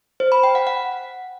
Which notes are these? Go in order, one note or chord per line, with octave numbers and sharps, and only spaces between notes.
C5
B5
G5
F#5
F#5